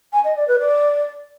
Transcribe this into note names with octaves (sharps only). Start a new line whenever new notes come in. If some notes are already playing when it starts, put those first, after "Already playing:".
G#5
D#5
D5
B4
D5